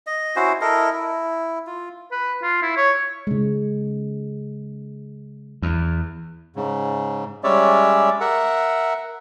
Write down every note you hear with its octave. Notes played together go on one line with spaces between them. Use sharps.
D#5
C#4 E4 F#4 C5
E4 A4 A#4 D#5
E4
F4
B4
F4
E4
C#5
C#3 G#3
E2
G#2 C#3
G3 G#3 C#4 C#5 D5 E5
A#4 E5 F#5